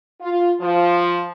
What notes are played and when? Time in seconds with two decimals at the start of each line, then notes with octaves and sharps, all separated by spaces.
0.21 F4
0.60 F3